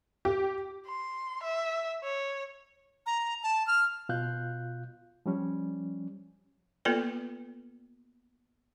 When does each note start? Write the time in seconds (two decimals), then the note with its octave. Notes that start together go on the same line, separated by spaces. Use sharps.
0.25 G4
0.86 C6
1.43 E5
2.04 C#5
3.06 A#5
3.43 A5
3.67 F6
4.09 B2 F4 F5 F#6 G6
5.26 F3 G3 C#4
6.85 A#3 B3 F4 A4 B4 D5